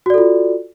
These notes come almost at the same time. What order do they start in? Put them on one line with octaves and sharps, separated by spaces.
F#4 D5 A4 F4